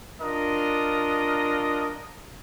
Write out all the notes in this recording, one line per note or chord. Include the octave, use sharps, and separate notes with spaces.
D4 F4 A#4 D#5